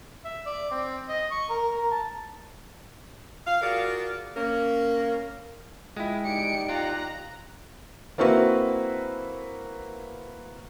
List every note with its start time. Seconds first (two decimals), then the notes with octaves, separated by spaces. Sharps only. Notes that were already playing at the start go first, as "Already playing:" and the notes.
0.25 E5
0.46 D5
0.71 C4
1.09 D#5
1.31 C#6
1.50 A#4
1.71 A#4
1.92 A5
3.46 F5
3.62 F4 F#4 G#4 A#4 D5 F5
4.36 A#3 C#4 A#4
5.97 G#3 E4 F4 G5
6.25 D#4 G4 D5 C#7 D7
6.69 F4 A#5 F#6
8.18 A#3 C4 E4 F#4 B4 E5